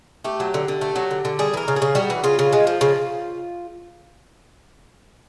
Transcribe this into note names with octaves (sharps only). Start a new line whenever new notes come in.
A3 G4
F#3
D3
D3
A3
F#3
D3
D3
G3 G#4
E3 A#4
C#3
G#4
C#3
G3 F#4
E3
C#3 F4
C#3
G#3
F3
C#3